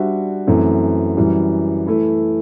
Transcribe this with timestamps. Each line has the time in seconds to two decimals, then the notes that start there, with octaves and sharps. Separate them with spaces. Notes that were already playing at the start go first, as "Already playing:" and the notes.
Already playing: G3 D4 F#4 C5 E5
0.47 F#2 E3 A3 C4
1.17 F#2 E3 G3
1.87 E3 A3 E4